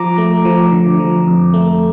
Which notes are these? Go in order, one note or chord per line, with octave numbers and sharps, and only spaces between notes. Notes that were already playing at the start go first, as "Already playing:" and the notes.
Already playing: F3 A#5 D6
A3
F3
D3
F3
F2
A3